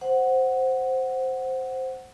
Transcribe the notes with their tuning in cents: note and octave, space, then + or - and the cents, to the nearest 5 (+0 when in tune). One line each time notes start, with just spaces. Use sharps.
C5 +0 F#5 +0